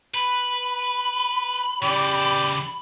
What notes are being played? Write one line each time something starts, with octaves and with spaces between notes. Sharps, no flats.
B4 B5
C#3 E3 G4 D5